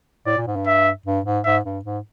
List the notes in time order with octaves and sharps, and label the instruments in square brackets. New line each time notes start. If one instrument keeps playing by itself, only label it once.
[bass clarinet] A2 [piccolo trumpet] D5
[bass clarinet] A#2
G#2
G2
[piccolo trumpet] E5
[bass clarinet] G2
G#2
[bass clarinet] G#2 [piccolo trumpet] E5
[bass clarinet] G2
G#2